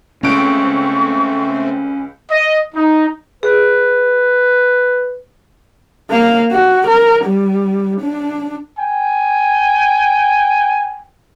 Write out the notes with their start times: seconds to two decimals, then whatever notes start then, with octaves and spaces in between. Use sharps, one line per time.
0.23 C#2 A3 C4 C#4 C#6 D7
2.30 D#5
2.75 D#4
3.43 G#4 B4
6.10 A#3 F5
6.52 F#4
6.87 A#4
7.25 G3
8.00 D4
8.78 G5 G#5